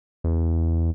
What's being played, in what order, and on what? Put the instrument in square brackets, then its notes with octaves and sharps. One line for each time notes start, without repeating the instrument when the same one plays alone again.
[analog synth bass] E2